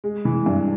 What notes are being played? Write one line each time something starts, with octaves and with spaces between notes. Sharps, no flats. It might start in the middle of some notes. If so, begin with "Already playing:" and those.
G#3
E3
G2